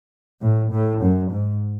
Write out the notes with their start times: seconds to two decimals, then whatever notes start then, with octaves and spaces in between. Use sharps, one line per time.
0.41 A2
0.72 A2
1.01 F#2
1.32 G#2